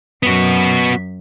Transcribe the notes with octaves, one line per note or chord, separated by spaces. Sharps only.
F#2 B3 F#4